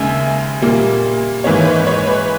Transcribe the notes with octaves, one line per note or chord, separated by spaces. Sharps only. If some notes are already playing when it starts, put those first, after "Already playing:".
Already playing: D#2 C#3 G#3 E5 G#5
A#2 G3 A#3
G#2 E3 A#3 C#5
B4
C#5
B4